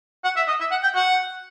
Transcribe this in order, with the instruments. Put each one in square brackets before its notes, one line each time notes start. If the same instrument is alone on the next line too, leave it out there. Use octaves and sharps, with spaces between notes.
[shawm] F#5
E5
D#5
E5
F#5
G5
F#5